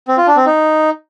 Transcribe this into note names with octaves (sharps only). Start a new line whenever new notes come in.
C4
F4
D4
C4
D#4